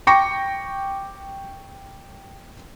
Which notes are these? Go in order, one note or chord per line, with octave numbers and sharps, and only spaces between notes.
G5 C#6 D6 A#6 C#7